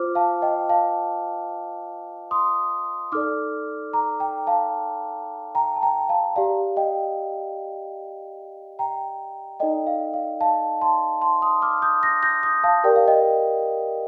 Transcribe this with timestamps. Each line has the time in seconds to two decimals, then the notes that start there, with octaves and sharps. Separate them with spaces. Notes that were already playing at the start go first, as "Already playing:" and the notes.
Already playing: F4 C5 D6 F6
0.15 F5 A5
0.42 D#5 G5
0.69 F5 A5
2.31 C6 D#6
3.12 D#4 A4 D5 D6 F6
3.93 A#5 D6
4.20 G5 A#5
4.47 F5 A5
5.55 G5 A#5
5.76 A5
5.82 G5 A#5
6.09 F5 A5
6.36 G4 D5 F5
6.77 D#5 G5
8.79 G5 A#5
9.60 D#4 A4 D5 D#5 G5
9.86 F5
10.14 F5
10.41 F5 A5
10.81 A5 C6
11.22 A5 C6
11.42 C6 D#6
11.62 D6 F6
11.82 D#6 G6
12.03 G6 A#6
12.23 G6 A#6
12.43 D#6 G6
12.64 F5 A5
12.84 G4 A#4 D5 G5
12.96 F5
13.08 D#5 G5